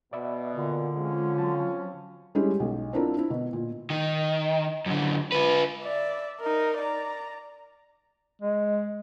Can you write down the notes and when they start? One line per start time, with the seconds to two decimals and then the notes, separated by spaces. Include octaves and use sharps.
0.13 B2 B3 D5 E5 B5
0.56 A#2 D3
0.96 F3 G#3 C4 C#4 F4
1.37 F#3 A5
2.35 G3 G#3 C#4 E4 G4 G#4
2.60 B1
2.93 C4 D4 E4 F4 A#4
3.18 E4
3.30 B2
3.53 A#2
3.90 D#3
4.86 F#2 D3
5.32 F4 B4
5.83 D5 E5
6.40 D#4 A#4
6.78 D5 A#5
8.41 G#3